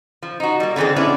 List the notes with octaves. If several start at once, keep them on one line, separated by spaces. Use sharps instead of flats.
F3
D#4 F#4
G3 A#3
D3 E3 C4 G#4 A4
B3 C#4 D4 E4